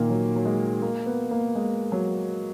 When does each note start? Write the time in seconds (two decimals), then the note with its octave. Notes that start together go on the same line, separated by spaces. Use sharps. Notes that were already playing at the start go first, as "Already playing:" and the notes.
Already playing: A#2 D#3 A#3
0.09 F#3
0.36 F#3
0.45 G#3
0.82 A#3
1.06 B3
1.31 A#3
1.55 G#3
1.92 F#3